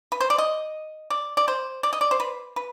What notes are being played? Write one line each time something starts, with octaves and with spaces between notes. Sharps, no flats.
B4
C5
D5
D#5
D5
D5
C5
D5
D#5
D5
C5
B4
B4